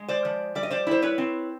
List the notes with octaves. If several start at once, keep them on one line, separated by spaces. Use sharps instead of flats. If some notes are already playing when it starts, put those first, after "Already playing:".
Already playing: G#3
C5 D5
F3
G3 D5
D#5
C5 D5
E4 C5
B4 C#5
C4